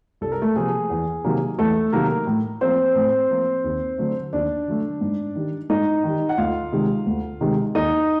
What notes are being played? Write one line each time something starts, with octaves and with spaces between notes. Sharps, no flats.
C2 A4
A#4
A3 A4
C3 F3 A#3 G#4
E2
C3 D#3 F#3 A#3
E2 A3 A4
C3 D#3 F#3 A#3 A#4
A2
F3 A#3 C4 C5
A2
F3 A#3
D#2
D3 F#3 A3
D#2 D4 D5
D3 F#3 A3
G#2
D#3 G3
G#2 D#4 D#5
D#3 G3
F#5
D2 F4 F5
C3 D#3 G#3
D2
C3 D#3 G#3
D#2 D#4 D#5